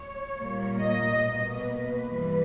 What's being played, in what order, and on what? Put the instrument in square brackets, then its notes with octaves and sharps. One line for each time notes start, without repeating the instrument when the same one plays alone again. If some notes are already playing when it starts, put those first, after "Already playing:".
Already playing: [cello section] C#5
A#2 G3 A#3
D#5
B2 A#3 D#5
B4
G2 E3 G3